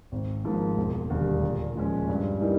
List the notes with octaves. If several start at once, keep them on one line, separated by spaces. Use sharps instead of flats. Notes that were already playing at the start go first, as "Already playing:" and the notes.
G#1
G#2 F3 A#3
E1
D#2 D3 G3
A#2
F3 G#3 C#4
G2
E3 G3 A#3 D#4